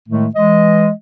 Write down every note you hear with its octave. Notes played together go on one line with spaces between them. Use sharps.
A2 D#3 G#3 A3
E3 G#3 D#5